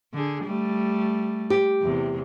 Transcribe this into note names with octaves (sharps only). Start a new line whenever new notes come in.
D3 G#4
G3 A3
G4
E2 C3